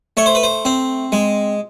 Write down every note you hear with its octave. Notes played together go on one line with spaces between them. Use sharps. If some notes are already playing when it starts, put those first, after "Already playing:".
A3 C#5
C5
B4
C5
C4
G#3